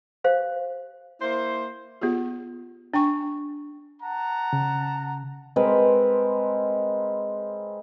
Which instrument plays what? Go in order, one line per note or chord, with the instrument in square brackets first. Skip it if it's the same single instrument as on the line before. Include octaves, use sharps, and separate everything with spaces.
[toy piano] G4 C5 F5
[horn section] A#3 E4 C5
[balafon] B3 F4 G4 G#4
D4 G5 G#5 C#6
[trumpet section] F#5 A5 A#5
[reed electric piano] C#3
[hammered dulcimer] G#3 C4 A#4 B4